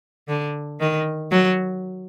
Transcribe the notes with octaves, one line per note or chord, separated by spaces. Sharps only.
D3
D#3
F#3